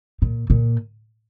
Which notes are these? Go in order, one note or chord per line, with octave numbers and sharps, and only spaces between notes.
A#2
A#2